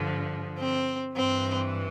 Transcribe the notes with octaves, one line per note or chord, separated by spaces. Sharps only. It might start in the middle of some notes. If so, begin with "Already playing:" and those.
Already playing: G2 D3 F3
C4
G2 E3 C4